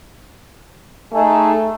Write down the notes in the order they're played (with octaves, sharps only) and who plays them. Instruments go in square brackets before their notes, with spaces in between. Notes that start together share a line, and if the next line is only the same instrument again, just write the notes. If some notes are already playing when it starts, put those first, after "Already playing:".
[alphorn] A3 [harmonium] D#4 G#4 A4